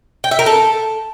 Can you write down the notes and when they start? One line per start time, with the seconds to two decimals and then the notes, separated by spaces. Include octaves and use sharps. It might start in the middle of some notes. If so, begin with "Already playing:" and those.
0.24 G5
0.31 E5
0.39 A#4
0.46 A4